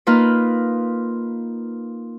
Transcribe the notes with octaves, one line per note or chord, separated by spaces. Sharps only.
A#3 D#4 F4 B4